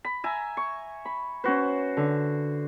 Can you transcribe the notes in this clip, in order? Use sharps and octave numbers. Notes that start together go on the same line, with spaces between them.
B5
E5 G#5 A#5
C#6
B5
C#4 F#4 B4 C5
D3